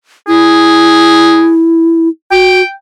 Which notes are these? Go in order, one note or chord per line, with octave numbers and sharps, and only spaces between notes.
E4 G#4
F#4 G5